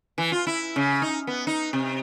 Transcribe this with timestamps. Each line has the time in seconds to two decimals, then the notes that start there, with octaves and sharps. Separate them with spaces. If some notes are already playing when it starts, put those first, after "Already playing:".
0.18 E3
0.32 F4
0.47 E4
0.76 C#3
1.02 D#4
1.27 B3
1.47 D#4
1.73 C3